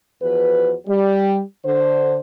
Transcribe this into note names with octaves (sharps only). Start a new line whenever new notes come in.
E2 F3 F#4 B4
G3
D3 C5